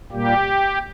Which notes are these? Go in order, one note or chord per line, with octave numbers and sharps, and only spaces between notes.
A#2 G3 A#3 G4